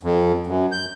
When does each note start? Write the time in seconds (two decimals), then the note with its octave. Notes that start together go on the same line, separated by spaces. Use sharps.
0.03 F2
0.47 F#2
0.72 G6